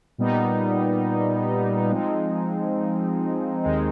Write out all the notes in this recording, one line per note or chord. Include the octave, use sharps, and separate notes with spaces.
A#2 G3 B3 D#4
F3 G#3 C4 D#4
D#2 D#3 G#3 C4 D#4